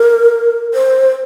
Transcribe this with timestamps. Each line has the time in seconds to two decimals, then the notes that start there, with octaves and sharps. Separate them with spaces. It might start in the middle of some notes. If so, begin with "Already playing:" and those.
Already playing: A#4
0.74 C5